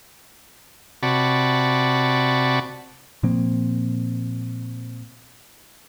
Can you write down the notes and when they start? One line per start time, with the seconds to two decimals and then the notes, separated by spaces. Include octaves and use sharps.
1.03 C3 F#4 D5 A5 B5 C#6
3.23 A#2 F3 A#3 C4